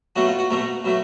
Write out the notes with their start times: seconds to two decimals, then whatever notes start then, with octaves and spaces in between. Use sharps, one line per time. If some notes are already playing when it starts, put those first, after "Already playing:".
0.16 B2 F#3 A3 F#4
0.27 F4
0.39 F#4
0.50 B2 F#3 A3 A#4
0.84 B2 F#3 A3